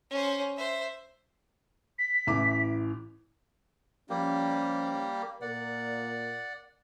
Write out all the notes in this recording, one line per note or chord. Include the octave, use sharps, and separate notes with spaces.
C#4 C5
C5 E5
B6
A1 E3 D6
F3 G3 A#3 C#4 G4
A#2 A#4 D5 F#5